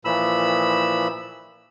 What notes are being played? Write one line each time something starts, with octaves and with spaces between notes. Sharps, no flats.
A#2 E3 F3 B5 E6